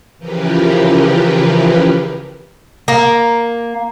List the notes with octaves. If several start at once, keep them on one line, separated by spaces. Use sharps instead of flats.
C#3 E3 F3 G4 A#4 B4
A#3